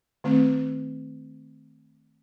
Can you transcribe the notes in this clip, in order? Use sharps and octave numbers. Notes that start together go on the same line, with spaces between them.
D#3 A3 C4